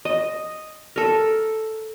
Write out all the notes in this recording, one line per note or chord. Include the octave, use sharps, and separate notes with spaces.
D#5
A4 A#4